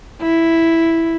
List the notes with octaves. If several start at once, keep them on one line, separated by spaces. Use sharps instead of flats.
E4